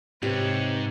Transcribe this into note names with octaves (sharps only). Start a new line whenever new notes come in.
G#2 C3 G4 B4 C#5